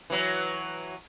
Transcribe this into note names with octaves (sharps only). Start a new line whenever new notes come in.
E3 F#3